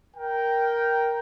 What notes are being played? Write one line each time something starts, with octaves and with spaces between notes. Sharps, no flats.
A#4 G5